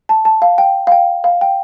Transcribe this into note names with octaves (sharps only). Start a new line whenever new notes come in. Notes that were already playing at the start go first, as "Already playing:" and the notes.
A5
A5
F5
G5
F5
G5
F5
G5